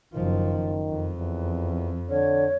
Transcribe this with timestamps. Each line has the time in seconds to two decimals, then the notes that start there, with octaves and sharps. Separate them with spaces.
0.14 F#1 D#3 F3
0.90 F2
1.19 E2
2.10 D3 C#5